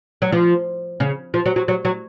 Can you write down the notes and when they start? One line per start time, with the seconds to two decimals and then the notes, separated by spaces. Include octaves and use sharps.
0.22 F#3
0.32 F3
1.00 C#3
1.34 F3
1.46 F#3
1.56 F#3
1.68 F#3
1.85 F#3